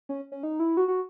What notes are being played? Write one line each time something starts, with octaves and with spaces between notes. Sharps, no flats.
C#4
C#4
D#4
E4
F#4
F#4